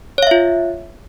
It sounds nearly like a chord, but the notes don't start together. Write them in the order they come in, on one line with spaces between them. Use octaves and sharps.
C#5 F5 E5 F4